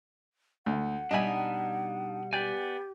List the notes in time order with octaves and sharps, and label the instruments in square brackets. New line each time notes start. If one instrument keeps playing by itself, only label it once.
[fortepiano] D2 [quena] F#5
[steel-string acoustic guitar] B2 G3 [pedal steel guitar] D4 D#4 B5 [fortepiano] D#5 E5 G#5
[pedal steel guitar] B3 D5 G#5 [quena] G4 [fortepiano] G5